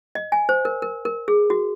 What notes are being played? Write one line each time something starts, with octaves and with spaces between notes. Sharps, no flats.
D#5
G#5
C5
A#4
A#4
A#4
G#4
F#4